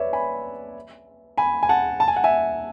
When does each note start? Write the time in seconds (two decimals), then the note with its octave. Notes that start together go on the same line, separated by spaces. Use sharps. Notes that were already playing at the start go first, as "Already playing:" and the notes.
Already playing: B4 C#5 D5 E5
0.13 G#5 B5
1.38 G#5 B5
1.63 G#5
1.69 F#5 A5
2.00 A5
2.08 G#5
2.16 F#5
2.24 E5 G#5